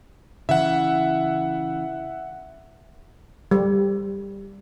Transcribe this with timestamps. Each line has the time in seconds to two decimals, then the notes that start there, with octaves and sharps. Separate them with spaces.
0.49 C#3 E3 E5 F#5
3.51 G3